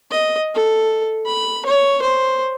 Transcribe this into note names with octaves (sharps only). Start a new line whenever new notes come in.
D#5
A4
B5
C#5
C5